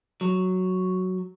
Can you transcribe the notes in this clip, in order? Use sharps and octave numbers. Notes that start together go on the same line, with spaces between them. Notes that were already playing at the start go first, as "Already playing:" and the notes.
F#3